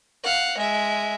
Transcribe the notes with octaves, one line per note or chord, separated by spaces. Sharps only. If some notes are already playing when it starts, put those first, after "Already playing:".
F5 F#5
G#3 E5